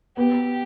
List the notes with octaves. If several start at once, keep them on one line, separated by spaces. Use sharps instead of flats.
B3 G4